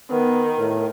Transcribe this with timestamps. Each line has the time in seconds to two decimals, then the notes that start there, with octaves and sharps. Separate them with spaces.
0.11 D#3 B3
0.59 A2